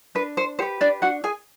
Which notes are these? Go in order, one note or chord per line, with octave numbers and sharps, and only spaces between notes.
D4 B4
C5
G4 B4 C5
D4 D5
D4 F#4 F#5
G#4 G#5